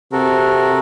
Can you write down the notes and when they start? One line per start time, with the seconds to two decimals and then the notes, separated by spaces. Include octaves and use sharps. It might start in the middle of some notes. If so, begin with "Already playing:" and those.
0.12 C3 F#4 A4 A#4